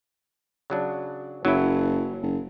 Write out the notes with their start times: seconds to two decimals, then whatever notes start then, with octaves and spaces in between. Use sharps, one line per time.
0.70 C#3 F#3 D4
1.45 F#1 F#3 E4
2.22 F#1